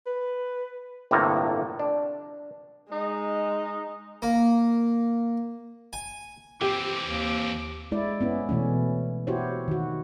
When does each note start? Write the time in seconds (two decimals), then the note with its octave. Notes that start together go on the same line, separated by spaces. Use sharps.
0.07 B4
1.11 G1 A2 C3 A#3 A4 A#5
1.79 D4
2.91 G#3 D#4
4.22 A#3
5.93 G#5
6.61 E3 C4 G4 D6
7.06 D#2
7.92 G#3 E4 D5
8.21 B3 C#4 E4
8.49 B2 E3 A3 C#4
9.27 E4 F#4 G4 C5 C#5
9.68 D#3 F#4